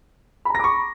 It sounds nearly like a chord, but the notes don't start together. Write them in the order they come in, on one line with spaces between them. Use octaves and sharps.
B5 A#5 A#6 D6 C#6